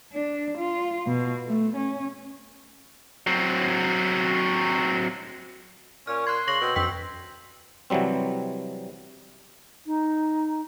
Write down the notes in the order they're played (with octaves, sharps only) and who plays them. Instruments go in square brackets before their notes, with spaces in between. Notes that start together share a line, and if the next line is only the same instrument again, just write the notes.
[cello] D4
F4
B2
A3
C#4
[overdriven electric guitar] F#3 C4
[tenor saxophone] A#2 [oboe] C#4 [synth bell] F6
[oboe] C6 [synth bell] F#6 G#6
[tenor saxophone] C#3 [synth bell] C#6 A#6 F#7
[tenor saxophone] B2 [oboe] C4
[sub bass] F2 [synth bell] E3 G5 B6 [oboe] C4
[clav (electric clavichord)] C3 E3 F#3 G3 C4
[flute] D#4